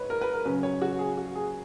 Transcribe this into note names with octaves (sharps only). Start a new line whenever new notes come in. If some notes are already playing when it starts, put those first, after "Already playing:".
Already playing: G#2 B4 C#5
A#4
B4
A#4
C#3 F#3 C#4 B4
C#5
F#4
G#4
F#4
G#4